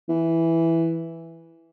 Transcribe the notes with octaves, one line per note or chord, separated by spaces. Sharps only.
E3